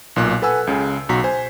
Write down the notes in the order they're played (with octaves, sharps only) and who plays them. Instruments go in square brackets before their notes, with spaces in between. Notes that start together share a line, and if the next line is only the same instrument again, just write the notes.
[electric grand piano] B1 A#2 F#6
A4 B4 F#5 G#5 E6
C#2 C#3
B1 F#4 A#5 B6
C5 G#5